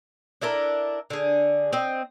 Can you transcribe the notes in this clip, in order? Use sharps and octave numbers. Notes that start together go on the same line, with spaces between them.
D4 E4 A4 A#4
D3 G#4
C4 D#5